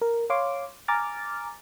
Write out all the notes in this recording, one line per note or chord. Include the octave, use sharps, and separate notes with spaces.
A#4
C#5 F5 C6 D6
G#5 A#5 D6 F6 A6